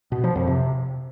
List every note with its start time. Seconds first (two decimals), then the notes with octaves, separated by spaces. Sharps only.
0.12 B2
0.24 F3
0.36 F2
0.47 C3